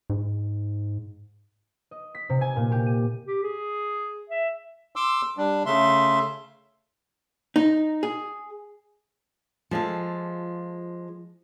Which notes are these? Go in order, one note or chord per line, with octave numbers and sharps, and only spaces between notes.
G#2
D#5
B6
C3
G#5
A#2
G4
D#7
G4
G#4
E5
C6 D6 E6
G3 D4
C#3 A3 E5 C6
D#4
G#4
F3 G#3 F4 A4